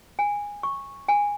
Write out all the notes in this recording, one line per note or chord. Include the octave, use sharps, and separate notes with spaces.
G#5
C#6
G#5